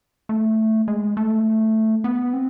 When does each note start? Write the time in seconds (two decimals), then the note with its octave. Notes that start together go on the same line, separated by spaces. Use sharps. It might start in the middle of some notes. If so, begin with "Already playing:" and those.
0.29 A3
0.88 G#3
1.17 A3
2.04 B3
2.33 C4